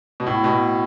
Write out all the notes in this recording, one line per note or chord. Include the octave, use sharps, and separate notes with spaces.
B2
A2
B2